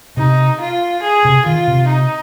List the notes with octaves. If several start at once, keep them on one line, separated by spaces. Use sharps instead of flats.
C3 D#4
F4
G#4
C3
D#3 F4
C3
D#4